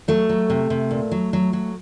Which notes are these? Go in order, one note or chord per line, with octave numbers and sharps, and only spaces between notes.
F#3 A3
F#3
C3
C3
A#2
F#3
F#3
F#3